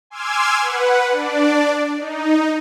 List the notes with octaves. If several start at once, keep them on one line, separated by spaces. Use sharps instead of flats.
G#5 C6 D6 E6 F6 G#6
B4 F#5
D4 D5
D#4